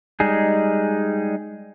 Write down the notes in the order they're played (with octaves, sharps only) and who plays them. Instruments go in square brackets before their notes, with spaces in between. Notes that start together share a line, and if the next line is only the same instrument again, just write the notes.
[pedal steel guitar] G3 G#3 D#4 G#4